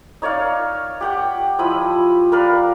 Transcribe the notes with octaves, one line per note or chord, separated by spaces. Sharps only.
D#4 C#5 D5 F5
G4 F#5 G5
F3 E4 D#5 B5
A#4 B4 D5 F5